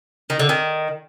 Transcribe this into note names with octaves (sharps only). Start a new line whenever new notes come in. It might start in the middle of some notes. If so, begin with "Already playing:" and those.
D#3
D3
D#3